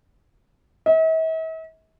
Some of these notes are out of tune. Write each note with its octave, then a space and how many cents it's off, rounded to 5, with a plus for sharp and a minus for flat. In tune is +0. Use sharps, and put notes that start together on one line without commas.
E5 -45